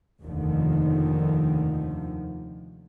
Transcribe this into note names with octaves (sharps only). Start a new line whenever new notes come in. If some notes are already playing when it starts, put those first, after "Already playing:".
F1 D#2 D3 D#3 F3